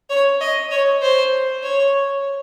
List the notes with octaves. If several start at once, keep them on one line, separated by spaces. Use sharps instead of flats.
C#5
D#5
C#5
C5
C#5